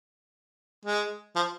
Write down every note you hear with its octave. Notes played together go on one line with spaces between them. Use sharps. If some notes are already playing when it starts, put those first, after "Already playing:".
G#3
F3